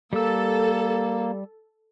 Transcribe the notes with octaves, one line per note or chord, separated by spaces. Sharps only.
G3 A#3 A4 E6